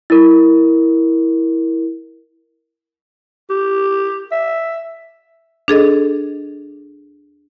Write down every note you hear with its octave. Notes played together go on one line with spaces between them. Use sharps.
E4 A#4
G4
E5
D4 G#4 A4 D#5